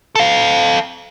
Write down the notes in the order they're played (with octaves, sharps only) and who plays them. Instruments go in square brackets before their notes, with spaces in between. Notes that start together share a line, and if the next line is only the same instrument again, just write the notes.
[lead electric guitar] A4 F5